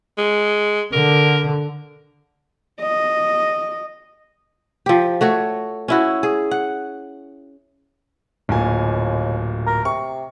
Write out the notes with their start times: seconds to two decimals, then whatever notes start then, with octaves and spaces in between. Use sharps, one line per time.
0.18 G#3
0.93 D3 A#4
2.81 D#5
4.86 F3 G4
5.21 A3 F#4 C#5
5.88 C#4 E4 F#4
6.23 G#4
6.51 F#5
8.49 D1 D#2 A#2 G#5
9.67 A#4
9.85 C3 C#6